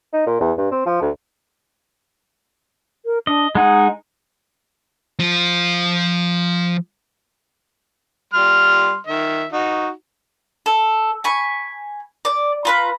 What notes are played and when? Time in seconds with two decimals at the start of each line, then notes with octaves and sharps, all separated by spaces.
0.13 D#4
0.27 A#2
0.41 E2
0.58 G2
0.71 C4
0.86 F3
1.02 D2
3.05 A#4
3.27 D4 D#5
3.55 G#3 D#4 G#4 F#5
5.20 F3 F4
8.34 G3 C6 F6
9.07 D#3 E5
9.53 D#4 F#4
10.66 A4
11.24 G#5 B5 C#6
12.25 D5
12.65 F4 B4 A#5